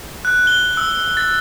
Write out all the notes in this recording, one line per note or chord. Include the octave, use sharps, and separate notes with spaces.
F#6
G7
E6
A6